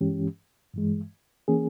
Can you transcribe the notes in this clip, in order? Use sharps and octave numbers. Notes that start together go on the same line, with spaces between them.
G2 E3 G#3 C#4 G4
G2 E3 G#3
E3 A#3 C#4 G#4